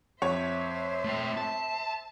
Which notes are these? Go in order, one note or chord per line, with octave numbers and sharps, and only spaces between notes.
F2 C5 C#5 E5
A3 G5
A5